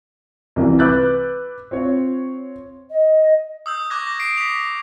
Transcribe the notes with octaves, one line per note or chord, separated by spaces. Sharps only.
C2 E3
B4 D6 E6 F#6 G6 A6
C4 F4 C#5
D#5
D#6 E6 G6
C#6 D6 F#6 G#6 A#6
A#6
C7 D7
B6 F7